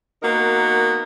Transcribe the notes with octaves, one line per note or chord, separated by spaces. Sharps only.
A#3 B3 D#4 F#4 A#4